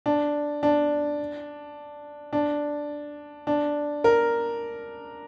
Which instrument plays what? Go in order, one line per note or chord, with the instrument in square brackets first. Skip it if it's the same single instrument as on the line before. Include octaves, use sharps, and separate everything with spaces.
[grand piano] D4
D4
D4
D4
A#4